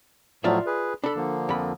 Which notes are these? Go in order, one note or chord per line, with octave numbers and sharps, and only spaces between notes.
A2 F3 F#3 F4 D5 E5
G#4 B4
D4 A4 B5
D3 F3 A#3
F2 B5